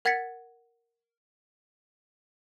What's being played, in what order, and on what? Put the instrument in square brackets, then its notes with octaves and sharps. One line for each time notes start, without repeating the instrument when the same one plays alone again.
[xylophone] A#4 F#5 G#6 A6 B6 C#7